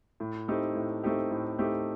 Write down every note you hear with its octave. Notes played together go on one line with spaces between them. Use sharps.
A2
A3 C4 D#4 G4
A2
A3 C4 D#4 G4
A2
A3 C4 D#4 G4